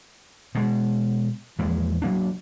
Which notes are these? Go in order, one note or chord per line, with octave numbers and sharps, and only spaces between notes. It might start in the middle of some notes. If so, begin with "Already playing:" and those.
B2 G#3
E2 F3 G#3 A#3
F#3 A#3 D4